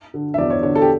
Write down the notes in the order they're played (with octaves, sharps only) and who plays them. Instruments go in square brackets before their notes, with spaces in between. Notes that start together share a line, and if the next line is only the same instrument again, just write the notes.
[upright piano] D3
E5
E2 D5
C#5
D3 C#5
A4
G4